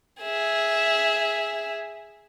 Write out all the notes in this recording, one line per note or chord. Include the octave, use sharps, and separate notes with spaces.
G#4 E5